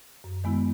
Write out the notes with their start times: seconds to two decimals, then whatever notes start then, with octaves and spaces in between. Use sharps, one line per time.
0.24 F#2
0.44 D#3 G#3 B3 E4